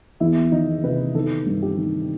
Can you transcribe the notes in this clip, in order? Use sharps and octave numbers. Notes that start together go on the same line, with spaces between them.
E2 E4
D#3 D#4
C3 B4
D#3 A4
G2
G4
D#3